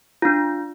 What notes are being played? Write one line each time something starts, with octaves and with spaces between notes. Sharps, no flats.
D4 F4